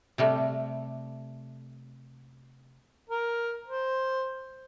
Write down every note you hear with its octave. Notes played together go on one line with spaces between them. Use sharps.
C3 G3 A3
A#4
C5